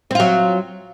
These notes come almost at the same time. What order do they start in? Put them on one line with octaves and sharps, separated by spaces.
C4 F4 F#3